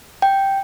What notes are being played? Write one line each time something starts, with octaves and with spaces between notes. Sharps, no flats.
G5